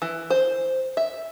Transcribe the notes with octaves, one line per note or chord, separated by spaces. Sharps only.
E3
C5
E5